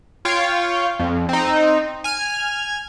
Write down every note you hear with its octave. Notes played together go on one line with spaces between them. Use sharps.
F4 C#5 F5 G5
F2
C4 D#4
G#5 F6